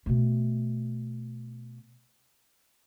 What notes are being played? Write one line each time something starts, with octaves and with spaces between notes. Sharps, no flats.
B2 A3